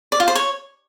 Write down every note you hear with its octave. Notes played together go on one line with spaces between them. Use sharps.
D5
F4
C5
C#5